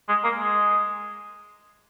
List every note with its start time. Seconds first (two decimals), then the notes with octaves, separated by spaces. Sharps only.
0.08 G#3
0.24 A#3
0.39 G#3